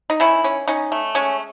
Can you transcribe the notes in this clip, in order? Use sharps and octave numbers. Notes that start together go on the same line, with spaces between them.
D#4
D#3 C#4 E4
C#4
C#4 D#4
A3
G#3 C#4